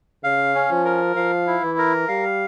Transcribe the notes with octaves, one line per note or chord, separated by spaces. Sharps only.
C#3 F5
C#4
F3
A#4
F3 F5
E4
E3
A#4
G3 F5